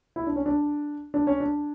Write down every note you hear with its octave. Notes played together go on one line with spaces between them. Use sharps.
E4
D4
C#4
D4
D4
C#4
D4